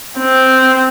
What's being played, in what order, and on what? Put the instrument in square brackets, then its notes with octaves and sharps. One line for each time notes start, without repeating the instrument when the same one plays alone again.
[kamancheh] C4